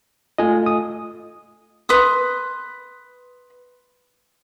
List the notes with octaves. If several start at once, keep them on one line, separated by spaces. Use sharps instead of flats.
A3 F4 D#5 G#5
D#6
B4 C6 D#6